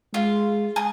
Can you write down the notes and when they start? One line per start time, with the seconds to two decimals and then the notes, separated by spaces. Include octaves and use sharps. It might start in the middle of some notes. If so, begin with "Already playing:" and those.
0.14 G#3 F4
0.76 G#4